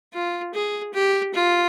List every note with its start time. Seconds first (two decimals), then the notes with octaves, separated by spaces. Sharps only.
0.14 F4
0.54 G#4
0.94 G4
1.34 F4